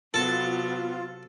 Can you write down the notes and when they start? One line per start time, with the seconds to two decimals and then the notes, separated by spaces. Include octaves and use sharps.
0.14 C3 F#3 B3 F4 A4